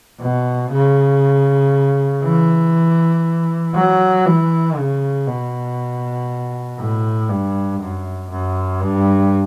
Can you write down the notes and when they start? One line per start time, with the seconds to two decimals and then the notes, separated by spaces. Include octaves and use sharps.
0.20 B2
0.71 C#3
2.23 E3
3.75 F#3
4.26 E3
4.77 C#3
5.28 B2
6.80 A2
7.30 G2
7.81 F#2
8.31 F#2
8.82 G2